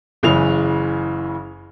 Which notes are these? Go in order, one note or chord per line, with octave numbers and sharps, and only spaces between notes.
F#1 C#3 E3 G#4 F7